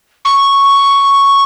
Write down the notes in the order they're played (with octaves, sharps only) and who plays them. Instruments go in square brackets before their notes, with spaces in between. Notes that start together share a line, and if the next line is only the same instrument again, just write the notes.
[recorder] C#6